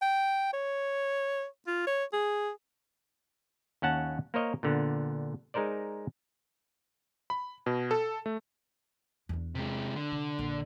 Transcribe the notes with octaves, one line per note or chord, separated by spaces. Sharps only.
G5
C#5
F4
C#5
G#4
D#2 C#4 F#5 A5
A#3 A#4 C5 C#5 D#5
A#2 D3 B3
G#3 D#4 A#4 C5 D5
B5
B2
A4
A3
E2 D4
C3 G#3
D3
C3
A#1